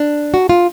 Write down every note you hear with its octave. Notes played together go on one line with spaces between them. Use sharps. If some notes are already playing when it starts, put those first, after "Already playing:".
Already playing: D4
F#4
F4